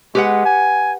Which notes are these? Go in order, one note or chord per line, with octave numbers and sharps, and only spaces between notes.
G#3 G4 B4 F#5
G#5